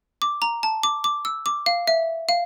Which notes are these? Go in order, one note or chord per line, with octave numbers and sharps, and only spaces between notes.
D6
A#5
A5
D6
D6
E6
D6
F5
E5
F5